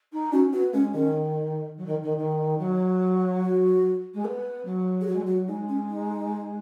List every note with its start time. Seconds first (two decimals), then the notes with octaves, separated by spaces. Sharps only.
0.12 D#4
0.32 C#4 F#4
0.53 B3 F#4
0.73 G#3 C#4
0.94 D#3 C#4
1.77 F#3
1.86 D#3
2.03 D#3
2.17 D#3
2.59 F#3
3.42 F#4
4.14 G#3
4.24 B3
4.65 F#3
5.01 G#4
5.07 F#3 F#4
5.14 G#3
5.21 F#3
5.27 F#4
5.48 G#3 D#4
5.69 C#4
5.89 D#4